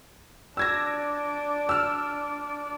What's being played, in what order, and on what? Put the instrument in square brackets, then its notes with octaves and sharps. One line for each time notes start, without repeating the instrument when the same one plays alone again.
[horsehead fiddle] D4 D5 [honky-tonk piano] E6 G#6 A#6
[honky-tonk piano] E6 F6